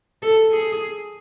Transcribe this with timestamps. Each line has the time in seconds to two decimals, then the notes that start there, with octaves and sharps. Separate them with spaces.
0.22 A4
0.51 G#4